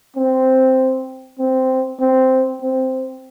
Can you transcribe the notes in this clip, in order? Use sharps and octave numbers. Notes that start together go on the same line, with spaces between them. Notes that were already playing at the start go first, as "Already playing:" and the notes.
C4
C4
C4
C4